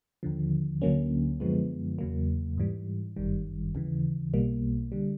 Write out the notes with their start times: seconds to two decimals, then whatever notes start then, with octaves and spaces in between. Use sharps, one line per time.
0.23 D#2 D3 F3
0.82 D2 D3 F#3 A#3 C#4
1.40 F#2 D3 F3 G#3 B3
1.99 E2 C#3 F#3 A#3
2.58 G#2 E3 G3
3.16 G1 F#2 D#3 G3
3.75 D#2 C#3 E3
4.34 B1 B2 G3 A#3
4.92 D3 G3